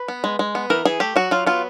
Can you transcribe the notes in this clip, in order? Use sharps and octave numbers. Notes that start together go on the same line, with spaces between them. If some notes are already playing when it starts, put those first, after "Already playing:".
Already playing: B4
B3
G#3
G#3
B3
E3 A#4
E3 G#4
A3 G4
F#3 F#4
F#3 F4
B3 F4